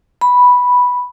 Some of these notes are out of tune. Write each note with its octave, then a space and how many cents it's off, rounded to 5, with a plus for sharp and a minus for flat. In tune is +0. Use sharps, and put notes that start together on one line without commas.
B5 -5